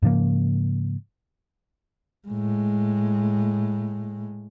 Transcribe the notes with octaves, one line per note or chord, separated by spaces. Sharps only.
G#2 C#3 F3 A#3
A2 G#3